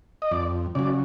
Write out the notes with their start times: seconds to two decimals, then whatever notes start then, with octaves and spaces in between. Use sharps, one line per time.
0.22 D#5
0.31 F2 D5
0.75 C#3 F#3 D5